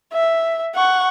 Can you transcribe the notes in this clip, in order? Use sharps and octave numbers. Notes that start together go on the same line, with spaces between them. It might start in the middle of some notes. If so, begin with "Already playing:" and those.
E5
F#5 C#6